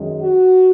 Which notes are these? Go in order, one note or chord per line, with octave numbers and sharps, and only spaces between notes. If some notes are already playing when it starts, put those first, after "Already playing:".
Already playing: F#2 D#3 G#3
F#4